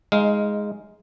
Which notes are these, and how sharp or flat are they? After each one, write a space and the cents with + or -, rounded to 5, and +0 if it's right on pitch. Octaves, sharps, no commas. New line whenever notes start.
G#3 +0 D#4 +20 F5 +0